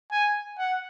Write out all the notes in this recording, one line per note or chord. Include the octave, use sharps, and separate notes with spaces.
G#5
F#5